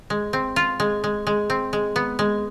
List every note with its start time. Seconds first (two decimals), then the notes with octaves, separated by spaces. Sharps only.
0.10 G#3
0.33 C4
0.56 F4
0.80 G#3
1.04 G#3
1.27 G#3
1.50 C4
1.73 G#3
1.96 B3
2.19 G#3